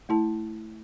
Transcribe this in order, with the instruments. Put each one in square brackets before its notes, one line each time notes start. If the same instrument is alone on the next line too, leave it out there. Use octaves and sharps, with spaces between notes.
[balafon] A3 E4 A5